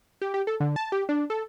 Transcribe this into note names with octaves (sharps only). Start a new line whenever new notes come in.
G4
G4
A4
D3
A5
G4
D4
A4